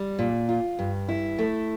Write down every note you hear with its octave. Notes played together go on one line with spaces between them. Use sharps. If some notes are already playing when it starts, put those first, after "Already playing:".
Already playing: G3
A#2
F4
G2
E4
A3